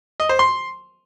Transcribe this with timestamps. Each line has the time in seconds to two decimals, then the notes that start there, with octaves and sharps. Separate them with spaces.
0.20 D#5
0.29 C5
0.39 C6